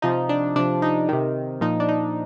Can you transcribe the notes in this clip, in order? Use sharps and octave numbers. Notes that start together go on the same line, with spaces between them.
C3 F3 D#4
D4
C3 F3 D4
D#4
C3 D#3
A#2 F3 D#4
D4
D#4